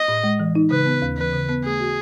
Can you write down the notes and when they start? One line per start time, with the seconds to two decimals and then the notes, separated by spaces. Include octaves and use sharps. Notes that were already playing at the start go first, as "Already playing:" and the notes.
Already playing: D#5
0.08 A2
0.24 G#3
0.40 E3
0.55 D#4
0.70 C#3 B4
0.86 B3
1.02 D#2
1.17 E3 B4
1.33 C#3
1.49 B3
1.64 A3 G#4
1.80 F#4